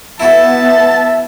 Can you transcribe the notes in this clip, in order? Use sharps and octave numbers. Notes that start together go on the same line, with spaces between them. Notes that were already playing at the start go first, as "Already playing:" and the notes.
B3 E4 F#4 E5 A5